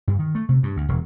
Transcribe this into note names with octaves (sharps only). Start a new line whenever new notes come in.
G2
D#3
A3
C3
G2
D2
E1